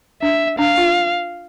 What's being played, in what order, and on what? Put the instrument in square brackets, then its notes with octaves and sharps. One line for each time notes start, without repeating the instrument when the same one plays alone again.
[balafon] D4 [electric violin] E5
[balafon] D4 [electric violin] F5
[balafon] F4